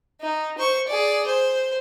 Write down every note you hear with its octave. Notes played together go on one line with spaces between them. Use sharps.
D#4
C5 C#6
G#4 D5
C5